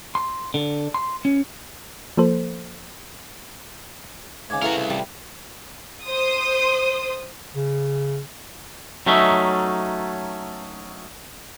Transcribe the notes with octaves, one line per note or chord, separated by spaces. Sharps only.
C6
D3
C6
C#4
F3 A#3 A4 C5
G#2 C#3 G#5 D6 G#6
C#3 A3 E4 F#4 A#4 B4 A5 A#5
C2
G3 A5
C5 D#6
C#3
F#3 A3 C#4 D#4 E5